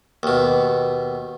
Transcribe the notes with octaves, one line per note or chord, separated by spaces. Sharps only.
D#2 B2